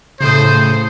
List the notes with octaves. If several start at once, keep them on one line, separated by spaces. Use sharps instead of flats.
A2 C#3 A4 C5 D#6